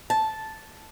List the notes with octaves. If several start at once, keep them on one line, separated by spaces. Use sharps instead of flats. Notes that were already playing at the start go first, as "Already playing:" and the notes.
A5